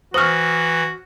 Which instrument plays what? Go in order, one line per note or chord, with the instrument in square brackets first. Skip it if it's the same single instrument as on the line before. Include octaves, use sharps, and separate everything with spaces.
[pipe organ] E3 [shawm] F#4 [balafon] C5 C#6 [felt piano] D#6 F6